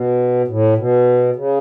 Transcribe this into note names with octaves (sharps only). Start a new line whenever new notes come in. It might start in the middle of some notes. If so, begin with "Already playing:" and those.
Already playing: B2
A2
B2
C#3